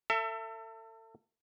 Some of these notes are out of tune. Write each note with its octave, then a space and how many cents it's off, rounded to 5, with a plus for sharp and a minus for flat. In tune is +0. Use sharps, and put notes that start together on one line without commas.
A4 +35 E5 +20